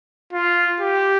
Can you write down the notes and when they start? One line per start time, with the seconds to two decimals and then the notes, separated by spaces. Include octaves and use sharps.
0.33 F4
0.80 G4